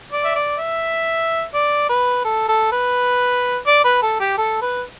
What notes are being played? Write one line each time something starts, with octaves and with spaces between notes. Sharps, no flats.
D5
E5
D5
E5
D5
B4
A4
A4
B4
D5
B4
A4
G4
A4
B4